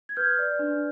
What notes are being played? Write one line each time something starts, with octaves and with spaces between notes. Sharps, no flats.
G#6
B4 F6 G6
D5
D4